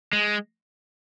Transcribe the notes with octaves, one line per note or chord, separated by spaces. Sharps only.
G#3